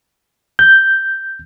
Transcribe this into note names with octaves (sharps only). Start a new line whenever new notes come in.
G6